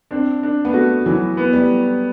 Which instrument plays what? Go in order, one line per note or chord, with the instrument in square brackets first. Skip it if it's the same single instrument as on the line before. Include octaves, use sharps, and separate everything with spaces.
[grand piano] C4 [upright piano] D4
[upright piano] D4
[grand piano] B3
[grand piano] A3 [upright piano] F#4
[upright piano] E3 [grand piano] F#3
[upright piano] B3
[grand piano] G3